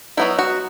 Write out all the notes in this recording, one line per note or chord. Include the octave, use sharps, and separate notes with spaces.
F#3 B3 D#4 E4
F#4